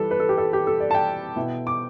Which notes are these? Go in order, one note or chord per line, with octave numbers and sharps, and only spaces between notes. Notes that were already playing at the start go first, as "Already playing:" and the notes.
Already playing: E3 G3 E4 A4 B4
B4
A4
G4
A4
G4
A4
D5
A5
G5
B2 B3 E4
D6